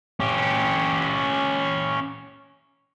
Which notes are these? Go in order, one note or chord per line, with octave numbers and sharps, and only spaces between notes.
C#4 G4